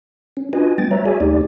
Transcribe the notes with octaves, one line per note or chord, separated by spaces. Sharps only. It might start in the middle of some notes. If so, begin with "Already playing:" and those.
C#4
D4 F4 F#4 B4 D#5 G#5
G3 A3 B3 G5 A6
G3 B4 C#5 E5 A#5
F#4 G#4 C#5 D5 E5 G#5
D#2 A3 D#4 G4 D5